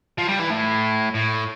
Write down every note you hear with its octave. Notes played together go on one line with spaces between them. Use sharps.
F3
G3
E3
A2
A2